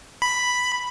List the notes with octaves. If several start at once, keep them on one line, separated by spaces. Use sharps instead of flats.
B5